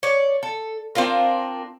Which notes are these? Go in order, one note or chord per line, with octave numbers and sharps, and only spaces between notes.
C#5 D5
A4
C4 D4 F4 A#4